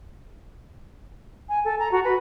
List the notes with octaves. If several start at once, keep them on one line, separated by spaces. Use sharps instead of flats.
G#5
A4
A#5
F#4
B4